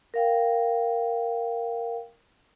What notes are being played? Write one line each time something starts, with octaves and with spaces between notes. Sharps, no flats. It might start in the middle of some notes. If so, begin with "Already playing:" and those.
A#4 F5 G5